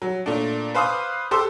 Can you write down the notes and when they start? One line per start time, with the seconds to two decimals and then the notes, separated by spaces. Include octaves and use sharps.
0.02 F#3
0.26 A#2 A3 D4
0.74 B4 C5 F5 D6 D#6 F#6
1.31 G4 A4 C5 C6 D6 E6